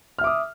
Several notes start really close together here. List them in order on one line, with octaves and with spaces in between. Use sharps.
F6 E5 D6 D#6